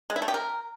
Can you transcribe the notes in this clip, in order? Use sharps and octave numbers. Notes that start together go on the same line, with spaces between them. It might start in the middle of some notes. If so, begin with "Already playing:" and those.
G#3
E4
A3
G4
A#4